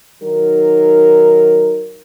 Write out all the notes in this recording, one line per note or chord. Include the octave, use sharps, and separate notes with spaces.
D#3 F#3 D#4 A#4